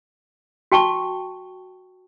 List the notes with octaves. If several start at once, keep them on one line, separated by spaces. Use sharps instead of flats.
F#4 G5 A5 C#6